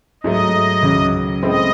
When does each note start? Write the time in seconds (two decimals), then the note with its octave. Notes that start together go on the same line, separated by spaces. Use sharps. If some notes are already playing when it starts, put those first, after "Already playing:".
0.24 G#2 F#3 A3 D#5
0.83 C#2 C#3 F#3 C#4
1.43 A2 G#3 C4 E4 A4 D#5